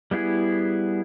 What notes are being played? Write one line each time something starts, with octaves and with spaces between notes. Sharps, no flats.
G3 B3 E4 G#4